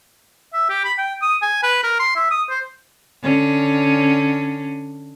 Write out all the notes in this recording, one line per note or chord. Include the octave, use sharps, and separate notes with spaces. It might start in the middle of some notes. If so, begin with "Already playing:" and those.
E5
G4
B5
G5
D#6
G#5
B4
A#4
C6
E5
D#6
C5
D3 C#4